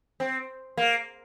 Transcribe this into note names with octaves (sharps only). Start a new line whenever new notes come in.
C4
A#3